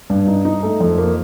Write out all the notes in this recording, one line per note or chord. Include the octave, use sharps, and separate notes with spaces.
G2
D#4
D#4
A3
F2
A#3